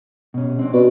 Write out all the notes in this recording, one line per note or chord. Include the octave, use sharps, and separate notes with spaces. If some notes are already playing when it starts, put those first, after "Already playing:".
B2 C#4
C4 D4
B2 D5